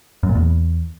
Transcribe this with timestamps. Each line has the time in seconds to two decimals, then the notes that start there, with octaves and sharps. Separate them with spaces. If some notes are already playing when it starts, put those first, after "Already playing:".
0.23 F#2
0.29 A#2
0.35 E2